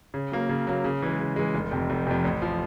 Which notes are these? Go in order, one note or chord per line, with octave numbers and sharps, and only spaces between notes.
C#3
F#3 A#3
C#3
F#3 A#3
C#3
E3 G#3
C#3
E3 G#3
F1
F2 C3
F1
F2 C3
A1
F3